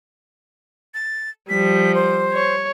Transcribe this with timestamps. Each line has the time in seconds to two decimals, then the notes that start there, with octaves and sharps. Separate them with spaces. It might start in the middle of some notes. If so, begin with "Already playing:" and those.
0.94 A6
1.49 F3 G3 B6
1.95 C5
2.34 C#5